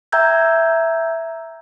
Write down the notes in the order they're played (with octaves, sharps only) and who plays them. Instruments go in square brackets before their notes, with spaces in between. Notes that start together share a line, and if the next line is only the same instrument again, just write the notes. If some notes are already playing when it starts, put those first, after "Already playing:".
[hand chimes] E5 G5 A#5 E6 G6 G#6